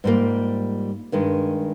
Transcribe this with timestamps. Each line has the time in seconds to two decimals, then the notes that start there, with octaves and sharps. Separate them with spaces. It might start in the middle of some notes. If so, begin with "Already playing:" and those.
0.04 G#2 G3 A#3 F4
1.12 G2 D#3 G#3